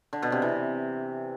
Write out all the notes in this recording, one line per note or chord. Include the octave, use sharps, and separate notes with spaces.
D3
B2
C3
E3